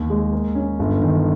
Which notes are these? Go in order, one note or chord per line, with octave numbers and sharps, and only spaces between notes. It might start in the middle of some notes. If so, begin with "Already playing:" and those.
Already playing: D#2
G#3
A#3
C#4
G1
D#3